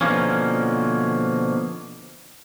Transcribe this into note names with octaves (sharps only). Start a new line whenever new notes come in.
B2 D3 F3 A#3 B3 C#4